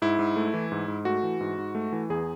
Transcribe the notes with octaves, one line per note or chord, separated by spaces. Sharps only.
G#2 E4
G#2
A3
E3
G#2
G#2
A3 F#4
E3
G#2
G#2
A3
E3
E2 G#4